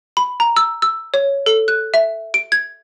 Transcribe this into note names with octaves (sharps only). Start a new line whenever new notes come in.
B5
A#5
E6
E6
C#5
A4
F#6
E5
D7
G#6